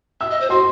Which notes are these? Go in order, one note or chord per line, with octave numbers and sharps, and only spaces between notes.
E5 E6
D#5
C5
F#4 C6